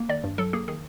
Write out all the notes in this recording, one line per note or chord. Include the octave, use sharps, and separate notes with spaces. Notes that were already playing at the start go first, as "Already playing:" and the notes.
Already playing: A#3
D#3 D5
G2
F#3 A4
A#3 G#4
D#3 G#4